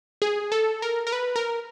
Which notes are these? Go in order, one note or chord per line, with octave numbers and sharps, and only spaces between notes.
G#4
A4
A#4
A#4
B4
A#4